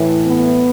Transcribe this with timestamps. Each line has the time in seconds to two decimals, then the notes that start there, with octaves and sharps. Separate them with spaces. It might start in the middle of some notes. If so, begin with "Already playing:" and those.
Already playing: A2 E3
0.26 B3